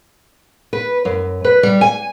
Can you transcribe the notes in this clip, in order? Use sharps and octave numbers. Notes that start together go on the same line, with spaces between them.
B4
F#2
B4
G3
G#5